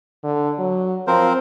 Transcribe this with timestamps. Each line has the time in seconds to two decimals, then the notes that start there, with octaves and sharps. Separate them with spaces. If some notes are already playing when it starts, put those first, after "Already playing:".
0.24 D3
0.59 F#3
1.07 F3 C4 A#4 C5